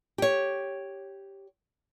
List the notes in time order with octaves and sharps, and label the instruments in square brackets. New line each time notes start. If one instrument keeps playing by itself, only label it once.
[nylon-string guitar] G4 C#5